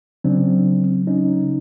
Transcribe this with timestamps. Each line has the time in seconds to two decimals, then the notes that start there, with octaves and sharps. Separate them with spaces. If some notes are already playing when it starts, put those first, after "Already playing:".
0.24 C#3 F#3 C4 D4
1.07 C#4 D#4